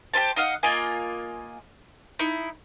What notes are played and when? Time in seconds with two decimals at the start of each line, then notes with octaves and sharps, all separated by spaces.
0.14 G4 A#4 C5 A5
0.36 D#4 D#5 F5 F#5
0.63 A#3 F4 D#5 G#5
2.19 D#4 E4